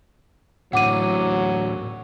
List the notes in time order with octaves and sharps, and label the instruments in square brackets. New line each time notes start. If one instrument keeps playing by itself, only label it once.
[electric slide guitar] A2 D3 E3 [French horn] F#3 [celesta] F#5 D6 D#7